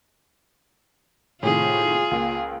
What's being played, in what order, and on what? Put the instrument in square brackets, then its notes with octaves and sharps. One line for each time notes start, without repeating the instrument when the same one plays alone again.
[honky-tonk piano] A2 C3 D#3 [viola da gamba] F4 G#4
[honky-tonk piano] C#2 A#3